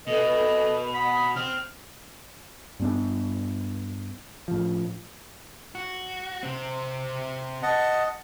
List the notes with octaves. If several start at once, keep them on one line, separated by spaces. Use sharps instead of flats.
B2 A4 B4 D#5
F#5 B5 D#6
C4 F6
G2 B3 D4
A2 F3
F#4
C3 C4
D#5 F#5 A5